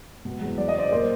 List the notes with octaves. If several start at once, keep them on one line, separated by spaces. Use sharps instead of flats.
B2
E2
F#3 D5
D#5
C#3 C5 D5
A#2 A#4 C5